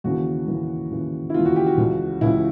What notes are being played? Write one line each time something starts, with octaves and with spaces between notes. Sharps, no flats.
D#2 C#3 E3 F#4
D#2 C#3 E3
D#2 C#3 E3
E4
D#2 C#3 E3 F4
F#4
G4
F#4
C#2 C#3 E3
C#2 C#3 E3 E4